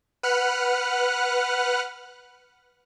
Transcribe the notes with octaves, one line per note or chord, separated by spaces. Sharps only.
B4 F#5 F6 F#6